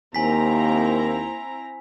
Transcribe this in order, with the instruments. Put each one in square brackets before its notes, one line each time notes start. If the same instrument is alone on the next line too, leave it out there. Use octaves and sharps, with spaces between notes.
[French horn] D#2 [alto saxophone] A#3 [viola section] C4 E4 A#5 [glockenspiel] G#5 B6